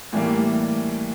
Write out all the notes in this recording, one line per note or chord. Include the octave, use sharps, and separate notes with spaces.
A2 E3 G3 A#3